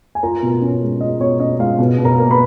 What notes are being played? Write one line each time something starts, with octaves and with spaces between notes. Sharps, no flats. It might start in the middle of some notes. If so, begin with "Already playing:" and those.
G#5
F4 A#4 A#5
B2
C#4
G#3
F4 D#5
B2 C#5
C#4 D#5
G#3 F4 F5
B2
B2
A#4 A#5
A#3
B4 B5